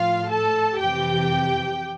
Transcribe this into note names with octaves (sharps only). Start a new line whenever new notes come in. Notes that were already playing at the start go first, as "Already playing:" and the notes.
Already playing: A2 F3 F4 F5
A4 A5
F2 C3 E3 G4 G5